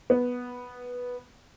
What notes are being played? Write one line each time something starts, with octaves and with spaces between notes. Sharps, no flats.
B3